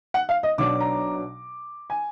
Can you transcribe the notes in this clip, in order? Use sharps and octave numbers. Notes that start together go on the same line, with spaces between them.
F#5
F5
D#5
B1 B2 F#3 D4 D6
A#5
G#5